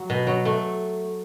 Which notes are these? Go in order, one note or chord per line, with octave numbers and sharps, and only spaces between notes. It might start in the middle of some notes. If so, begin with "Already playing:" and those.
Already playing: F#3
B2
F#3
A3